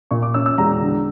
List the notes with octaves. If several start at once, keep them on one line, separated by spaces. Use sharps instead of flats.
A#2 C#6
D6
C#4 E6
E6
E1 A#5
D3